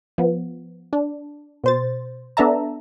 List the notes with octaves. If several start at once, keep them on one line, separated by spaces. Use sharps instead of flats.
F3 B3
D4
B2 C5 A6
B3 D4 A4 E5 A5 A#5